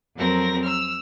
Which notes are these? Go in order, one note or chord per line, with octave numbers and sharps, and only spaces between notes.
F2 F#3 C4 A#4 A#6
E6 F6